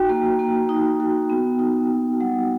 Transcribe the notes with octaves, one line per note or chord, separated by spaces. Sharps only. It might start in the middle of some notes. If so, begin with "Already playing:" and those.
Already playing: D#4 F#4 G5
A#3
A#3
D#4
F#4
B3
D#4
F#4
G3 F#5